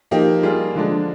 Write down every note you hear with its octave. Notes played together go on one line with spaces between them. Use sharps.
F3 A#3 D#4 G4
G3 A#3 F4 G#4
D3 F3 G#3 D4